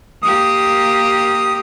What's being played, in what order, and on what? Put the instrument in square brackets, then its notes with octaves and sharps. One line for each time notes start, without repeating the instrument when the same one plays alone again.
[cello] A#3 G4 [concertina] D#6